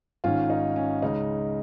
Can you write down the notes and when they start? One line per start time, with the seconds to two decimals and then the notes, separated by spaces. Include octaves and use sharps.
0.24 G#1 G#2 D#3 C#4 F4
0.50 D#4
0.76 C#4
1.02 C#2 C#3 G#3 D#4